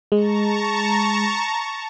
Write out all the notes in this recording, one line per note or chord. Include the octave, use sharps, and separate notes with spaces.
G#3 A5 A#5 C#6